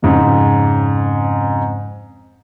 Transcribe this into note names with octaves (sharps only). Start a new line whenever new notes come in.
F2 G#2 C#3